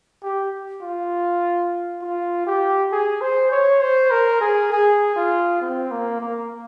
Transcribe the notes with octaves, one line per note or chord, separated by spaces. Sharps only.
G4
F4
F4
G4
G#4
C5
C#5
C5
A#4
G#4
G#4
F4
C4
A#3
A#3